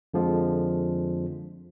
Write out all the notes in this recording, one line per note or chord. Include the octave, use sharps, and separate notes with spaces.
F2 D3 F3 G#3